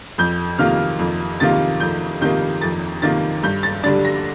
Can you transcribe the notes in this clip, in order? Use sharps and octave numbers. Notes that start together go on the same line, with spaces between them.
F2 G6
C3 D#3 A#3 F4 F6
F2
C3 D#3 A#3 F4 A6
F2 G6
C3 D#3 A#3 F4 G6
F2 A6
C3 D#3 A#3 F4 A6
G2 G6
A6
D3 G3 D4 A6
A#6